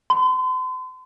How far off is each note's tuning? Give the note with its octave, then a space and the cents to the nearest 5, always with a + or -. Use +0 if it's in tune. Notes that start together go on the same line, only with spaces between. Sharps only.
C6 -40